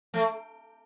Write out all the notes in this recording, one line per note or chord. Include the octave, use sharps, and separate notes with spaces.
A3